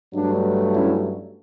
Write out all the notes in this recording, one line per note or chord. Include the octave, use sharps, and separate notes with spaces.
G2 F#3 A3 D4
C#4 E4